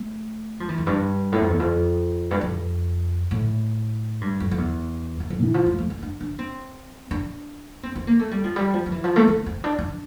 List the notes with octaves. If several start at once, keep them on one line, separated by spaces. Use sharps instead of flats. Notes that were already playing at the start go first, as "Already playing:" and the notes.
Already playing: A3
F3
E3
F2
G2
A2
F2
E2
F2
G2
F2
A2
G2
F2
F2
E2
E2
F2
E3
F3
A3
A3
C4
D4
D4
C4
D4
C4
C4
A#3
A3
G3
F3
G3
F3
F3
E3
F3
A3
C4
C4
D4
D4